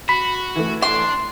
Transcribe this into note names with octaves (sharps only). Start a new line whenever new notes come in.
F#4 B5 B6
E3 A3
D4 C6